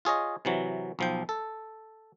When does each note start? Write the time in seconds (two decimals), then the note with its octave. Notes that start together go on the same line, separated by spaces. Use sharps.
0.05 F4 G#4 C#5 D#5
0.45 C3 E3 F#3
0.99 B1 F3 G5
1.29 A4